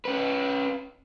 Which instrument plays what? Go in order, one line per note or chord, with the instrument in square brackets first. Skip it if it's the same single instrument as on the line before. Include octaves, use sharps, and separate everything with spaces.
[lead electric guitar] C#4 B4